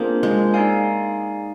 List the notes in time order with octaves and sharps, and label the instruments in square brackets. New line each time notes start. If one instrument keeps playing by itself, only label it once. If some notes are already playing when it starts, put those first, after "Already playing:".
Already playing: [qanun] A#3 C4 [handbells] D4 F4 G#4 C5
[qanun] G#3
[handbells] D#4 G#4 D5 F5 G#5